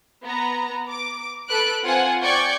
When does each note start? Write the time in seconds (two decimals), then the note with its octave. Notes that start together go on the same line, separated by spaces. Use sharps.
0.23 B3 A#5
0.90 D6
1.48 A4 B4 F#6 D7
1.85 C4 F4 C5 F#5 G#5
2.22 D5 G5 C#6 G6 G#6 C#7